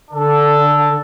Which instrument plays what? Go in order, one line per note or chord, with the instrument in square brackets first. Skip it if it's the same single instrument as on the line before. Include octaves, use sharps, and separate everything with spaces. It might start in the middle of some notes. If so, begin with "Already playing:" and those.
[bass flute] D3 [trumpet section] D4 A4